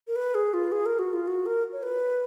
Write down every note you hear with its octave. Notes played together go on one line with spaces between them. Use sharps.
A#4
B4
G#4
F4
G#4
A#4
F#4
F4
F#4
A#4
C#5
B4